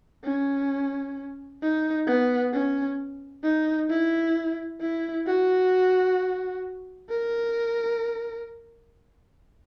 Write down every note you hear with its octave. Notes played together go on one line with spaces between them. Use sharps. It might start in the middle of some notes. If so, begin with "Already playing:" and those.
C#4
D#4
B3
C#4
D#4
E4
E4
F#4
A#4